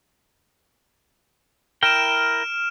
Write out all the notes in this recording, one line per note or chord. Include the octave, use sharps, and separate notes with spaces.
E4 A#4 G5 F6 D7 E7